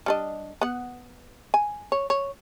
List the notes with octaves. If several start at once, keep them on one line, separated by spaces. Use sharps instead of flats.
G3 D4 D#5
B3 F#5
G#5
C#5
C#5